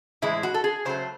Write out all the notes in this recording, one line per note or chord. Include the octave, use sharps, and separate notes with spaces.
A2 E3 G#3 E4
F#4
A4
G#4
C#3 F#3 A3 C5